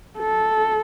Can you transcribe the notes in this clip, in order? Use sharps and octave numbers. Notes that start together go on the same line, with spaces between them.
A4